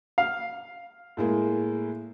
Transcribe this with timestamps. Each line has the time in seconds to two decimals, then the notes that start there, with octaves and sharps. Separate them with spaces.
0.18 F5
1.17 A2 G#3 A#3